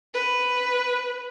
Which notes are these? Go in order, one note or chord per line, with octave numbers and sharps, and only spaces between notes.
B4